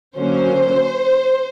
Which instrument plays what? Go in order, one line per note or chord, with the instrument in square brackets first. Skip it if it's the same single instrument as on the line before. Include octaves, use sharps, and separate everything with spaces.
[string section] D3 F#3 A#3 C#4 C5